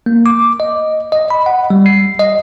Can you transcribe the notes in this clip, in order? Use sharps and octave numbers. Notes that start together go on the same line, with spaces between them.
A#3
D6
D#5
D#5
B5
F#5
G3
C7
D#5